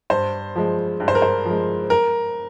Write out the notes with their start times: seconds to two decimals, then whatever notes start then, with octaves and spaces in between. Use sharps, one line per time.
0.10 G2 C5
0.56 F3 G#3
1.00 G2
1.08 C5
1.15 A#4
1.22 C5
1.46 F3 G#3
1.90 A#4